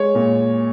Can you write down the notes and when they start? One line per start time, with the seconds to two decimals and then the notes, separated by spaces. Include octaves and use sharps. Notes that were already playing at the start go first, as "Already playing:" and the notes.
Already playing: G#3 C#5
0.15 A#2